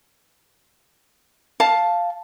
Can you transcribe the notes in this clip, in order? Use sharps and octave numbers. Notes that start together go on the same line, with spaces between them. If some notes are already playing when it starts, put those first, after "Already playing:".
F5 A5